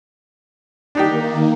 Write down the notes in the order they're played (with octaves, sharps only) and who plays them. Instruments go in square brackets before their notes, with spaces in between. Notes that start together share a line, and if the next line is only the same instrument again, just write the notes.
[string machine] D#3 A#3 [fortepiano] D4 D#4 G4